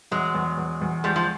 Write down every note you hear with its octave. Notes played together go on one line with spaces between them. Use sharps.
E2 F#3 G#3
E2
E2
E2
F3 G3 G#3
F3